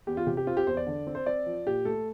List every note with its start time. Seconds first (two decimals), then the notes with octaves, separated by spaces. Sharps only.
0.07 E2 G4
0.17 F4
0.27 C3 G4
0.37 G4
0.47 C4 F4
0.57 G4
0.67 E2 C5
0.77 D5
0.87 D3
1.07 C4
1.15 C5
1.26 C4 D5
1.46 F3
1.66 A#2 G4
1.85 A3 A4